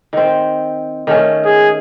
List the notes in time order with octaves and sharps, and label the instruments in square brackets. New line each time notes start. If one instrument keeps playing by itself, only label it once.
[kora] D#3 C4
D#3 A3 C#4
[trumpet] G#4